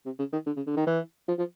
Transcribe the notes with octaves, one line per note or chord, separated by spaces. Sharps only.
C3
C#3
D#3
D3
C#3
D3
D#3
E3
F3
F3